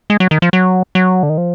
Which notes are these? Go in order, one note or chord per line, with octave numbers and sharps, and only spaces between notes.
G#3
F#3
D#3
F3
F#3
F#3
D3
D#3
F3